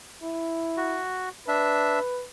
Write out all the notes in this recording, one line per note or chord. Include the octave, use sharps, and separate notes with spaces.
E4
F#4
D4 B4 E5